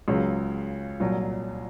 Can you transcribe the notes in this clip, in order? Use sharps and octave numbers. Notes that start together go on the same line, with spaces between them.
C#2 C#3 F#3
C2 A#2 F#3